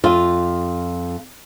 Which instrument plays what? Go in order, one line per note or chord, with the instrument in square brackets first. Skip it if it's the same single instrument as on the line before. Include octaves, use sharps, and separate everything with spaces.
[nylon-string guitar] F2 F4